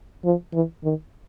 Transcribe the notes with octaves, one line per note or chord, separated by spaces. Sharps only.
F3
E3
D#3